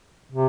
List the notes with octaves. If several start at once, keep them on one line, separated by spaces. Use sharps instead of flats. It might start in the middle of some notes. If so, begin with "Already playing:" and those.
C3